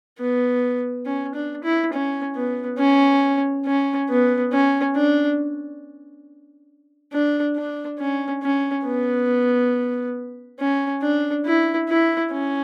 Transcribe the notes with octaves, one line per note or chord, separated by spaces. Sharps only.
B3
C#4
D4
E4
C#4
B3
C#4
C#4
B3
C#4
D4
D4
D4
C#4
C#4
B3
C#4
D4
E4
E4
C#4